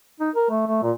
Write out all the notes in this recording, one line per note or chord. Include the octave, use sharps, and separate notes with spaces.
D#4
A#4
A3
A3
A#2